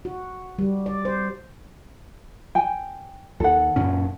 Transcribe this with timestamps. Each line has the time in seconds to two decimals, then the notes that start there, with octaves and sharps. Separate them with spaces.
0.05 F#4
0.59 G3
0.86 D5
1.05 C5
2.55 G5 G#5
3.40 D#2 A4 F#5
3.76 F#2 A#2 C#4